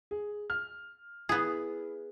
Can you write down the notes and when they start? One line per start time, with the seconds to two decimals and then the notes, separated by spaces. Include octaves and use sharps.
0.11 G#4
0.50 F6
1.29 B3 E4 G#4